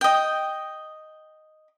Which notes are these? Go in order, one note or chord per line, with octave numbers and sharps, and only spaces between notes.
D#5 G5